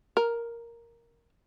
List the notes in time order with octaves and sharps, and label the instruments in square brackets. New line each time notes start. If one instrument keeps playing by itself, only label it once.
[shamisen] A#4